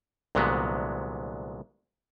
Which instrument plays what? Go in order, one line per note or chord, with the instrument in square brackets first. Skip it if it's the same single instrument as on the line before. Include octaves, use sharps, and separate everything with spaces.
[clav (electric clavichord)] C2 A#2 D3 F#3 G#3 B3